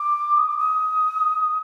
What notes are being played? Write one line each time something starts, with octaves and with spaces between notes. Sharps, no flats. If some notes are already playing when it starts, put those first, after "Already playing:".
Already playing: D6
D#6
D6
D#6